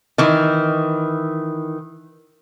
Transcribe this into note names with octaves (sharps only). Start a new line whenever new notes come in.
D#3 E3